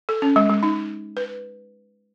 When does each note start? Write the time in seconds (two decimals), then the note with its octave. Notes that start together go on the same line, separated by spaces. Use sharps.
0.09 A4
0.22 C#4
0.36 G#3
0.49 G#3
0.63 D#4
1.17 B4